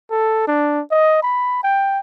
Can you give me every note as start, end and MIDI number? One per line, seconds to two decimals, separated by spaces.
0.11 0.45 69
0.47 0.82 62
0.91 1.19 75
1.23 1.59 83
1.64 2.00 79